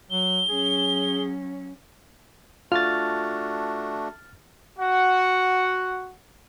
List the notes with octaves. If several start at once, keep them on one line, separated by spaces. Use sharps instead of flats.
F#3 G7
F#3 C#4 G#4
A3 D4 F4 F#4 F6 A6
F#4 F#5